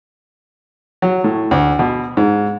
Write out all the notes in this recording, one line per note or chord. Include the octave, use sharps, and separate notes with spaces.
F#3
A2
D2
B2
G#2